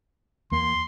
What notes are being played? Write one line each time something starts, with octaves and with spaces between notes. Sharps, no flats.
E2 A#3 C6